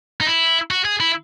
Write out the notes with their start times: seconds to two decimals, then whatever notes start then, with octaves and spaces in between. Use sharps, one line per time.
0.21 D#4
0.27 E4
0.71 F#4
0.85 G#4
1.00 E4